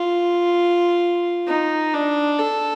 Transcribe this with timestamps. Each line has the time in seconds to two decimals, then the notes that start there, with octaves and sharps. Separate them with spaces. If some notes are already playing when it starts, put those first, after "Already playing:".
Already playing: F4
1.48 D#4
1.93 D4
2.39 A4